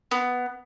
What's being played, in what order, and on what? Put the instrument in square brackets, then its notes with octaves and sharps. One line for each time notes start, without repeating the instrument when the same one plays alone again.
[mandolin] B3